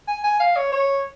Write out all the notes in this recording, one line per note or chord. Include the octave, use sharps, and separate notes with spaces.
G#5
G#5
F5
C#5
C#5